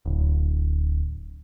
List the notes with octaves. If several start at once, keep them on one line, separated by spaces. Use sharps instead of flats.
D1